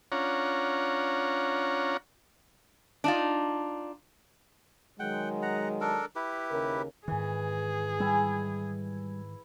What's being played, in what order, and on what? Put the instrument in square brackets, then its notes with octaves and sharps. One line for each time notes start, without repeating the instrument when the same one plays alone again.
[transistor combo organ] C#4 D4 F4 C#5 F#5 A#5
[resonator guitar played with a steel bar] D4 D#4 F4
[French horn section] D#3 F#3 G#3 [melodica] F#5 G5
[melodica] F#5 A#5
D4 A4 A#4
E4 G4 B4
[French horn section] D#2 C#3 A#4
[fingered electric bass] G#2 D#3 [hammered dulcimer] E3 [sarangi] G#4
[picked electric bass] G3 [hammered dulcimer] E4 G#5